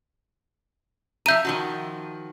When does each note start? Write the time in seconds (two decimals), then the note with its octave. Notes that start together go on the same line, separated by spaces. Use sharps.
1.26 F3 E5 A#5 G6 D#7
1.45 D#3 F3 F#4